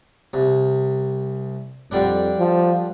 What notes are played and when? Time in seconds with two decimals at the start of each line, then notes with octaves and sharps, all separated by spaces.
0.33 C2
1.91 F2 D3 G3 D4
2.38 F3